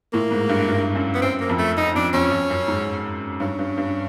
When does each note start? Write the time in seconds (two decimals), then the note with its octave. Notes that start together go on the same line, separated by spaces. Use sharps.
0.13 A2 A#3
0.31 G#2
0.49 G2
0.68 G2
0.95 F#2
1.15 B3
1.22 F#2 C4
1.40 A#3
1.49 F2
1.59 A3
1.77 D#4
1.95 F2 D4
2.14 F2 C#4
2.31 F2
2.50 F#2
2.68 G#2
3.40 G2 C#4
3.59 G2
3.77 G2